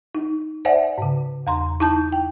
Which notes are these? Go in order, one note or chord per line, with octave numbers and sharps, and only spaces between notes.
D#4
C5 D5 E5 F#5 G#5
G#2 C#3
E2 A#5 C6
D#4 E4 A5 G6
G5